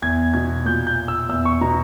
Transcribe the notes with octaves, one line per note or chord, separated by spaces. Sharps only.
E2 G#6
B2 G#6
A#2 G6
G6
E6
E2 E6
C#6
B2 A#5